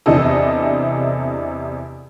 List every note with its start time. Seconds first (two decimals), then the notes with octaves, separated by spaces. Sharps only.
0.06 E2 C3 E3 D4 A4 D#5